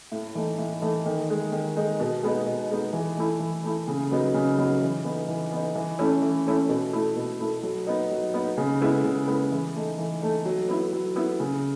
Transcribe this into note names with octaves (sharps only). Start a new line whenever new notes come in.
A2
E3 A3 D#4
A2
E3 A3 D#4
D#3
G#3 D#4
D#3
G#3 D#4
B2
G#3 B3 D#4
B2
G#3 B3 D#4
E3
A3 E4
E3
A3 E4
C#3
F#3 B3 D#4
C#3
F#3 B3 D#4
E3
B3 D#4
E3
B3 D#4
E3
A3 C#4 E4
E3
A3 C#4 E4
B2
A3 E4
B2
A3 E4
F#3
B3 D#4
F#3
B3 D#4
C#3
G#3 B3 E4
C#3
G#3 B3 E4
E3
A3 D#4
E3
A3 D#4
F#3
B3 E4
F#3
B3 E4
C#3